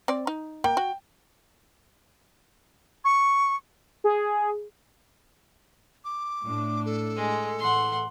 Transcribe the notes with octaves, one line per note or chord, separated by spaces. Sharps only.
C4 D5
D#4
A#3 G5
F#4
C#6
G#4
D6
A2 D4
A4
G#3
A2 E3 F#5 C6